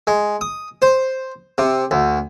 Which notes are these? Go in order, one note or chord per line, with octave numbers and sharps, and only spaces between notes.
G#3
D#6
C5
C3
D2